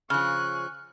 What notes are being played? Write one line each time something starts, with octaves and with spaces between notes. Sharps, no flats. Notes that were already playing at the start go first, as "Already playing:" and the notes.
C#3 F3 G#5 C#6 F6 F#6